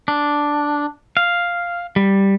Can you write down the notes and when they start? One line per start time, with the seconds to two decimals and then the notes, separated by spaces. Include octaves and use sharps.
0.08 D4
1.17 F5
1.96 G3